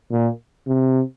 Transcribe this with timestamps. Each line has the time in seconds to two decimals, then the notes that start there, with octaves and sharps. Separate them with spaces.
0.11 A#2
0.67 C3